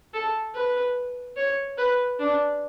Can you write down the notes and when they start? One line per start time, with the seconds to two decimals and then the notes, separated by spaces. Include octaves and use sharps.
0.14 A4
0.54 B4
1.36 C#5
1.78 B4
2.19 D4